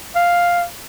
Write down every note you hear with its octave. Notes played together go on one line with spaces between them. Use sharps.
F5